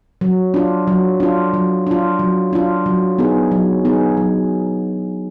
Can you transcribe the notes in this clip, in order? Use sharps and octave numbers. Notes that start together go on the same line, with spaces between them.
F#3
D4 F4
F#3
D4 F4
F#3
D4 F4
F#3
D4 F4
F#3
B3 D#4 G#4
F#3
B3 D#4 G#4
F#3